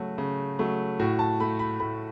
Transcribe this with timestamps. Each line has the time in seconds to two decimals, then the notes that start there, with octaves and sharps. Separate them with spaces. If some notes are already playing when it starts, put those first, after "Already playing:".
Already playing: C#3 F#3 A3 F#4
0.18 C#3
0.59 F#3 A3
0.99 A2 F#4
1.19 A5
1.40 A3 B5
1.59 B5
1.80 A2 B5